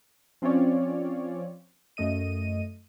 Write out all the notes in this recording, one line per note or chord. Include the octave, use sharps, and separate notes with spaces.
F3 C4 C#4 F4 C#5 D5
F#2 A3 D#5 D#7